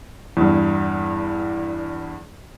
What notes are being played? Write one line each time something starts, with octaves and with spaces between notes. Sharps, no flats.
E2 G2